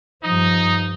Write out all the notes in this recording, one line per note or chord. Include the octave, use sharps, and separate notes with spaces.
G2 F3 D#4